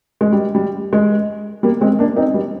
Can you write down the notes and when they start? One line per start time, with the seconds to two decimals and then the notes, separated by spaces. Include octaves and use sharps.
0.21 G#3
0.32 G3
0.55 G3
0.93 G#3
1.63 G3 A#3
1.81 G#3 C4
1.99 A#3 D4
2.17 C4 D#4
2.34 G3